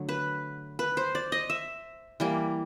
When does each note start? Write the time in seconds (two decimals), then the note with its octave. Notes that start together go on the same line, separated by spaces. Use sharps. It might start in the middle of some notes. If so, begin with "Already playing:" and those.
Already playing: D3 F#3 A3
0.09 B4
0.79 B4
0.97 C5
1.15 D5
1.32 D#5
1.50 E5
2.20 E3 G3 A#3